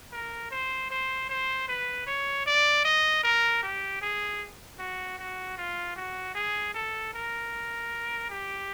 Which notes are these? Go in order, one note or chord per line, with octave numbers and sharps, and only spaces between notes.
A#4
C5
C5
C5
B4
C#5
D5
D#5
A#4
G4
G#4
F#4
F#4
F4
F#4
G#4
A4
A#4
G4